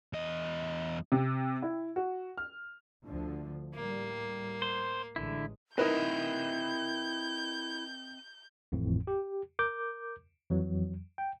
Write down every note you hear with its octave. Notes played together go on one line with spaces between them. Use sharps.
E2 D#5
C3
E4
F#4
F6
D2 D3 F3
A2 G3 A#3
C5
A1 D3 G#3 E4
C4 D#4 E4 A#4 B4 D#5 E5 G6
G#1 F2 A2 E3
G4
A#4 D6 G6
F2 E3 F#3
G5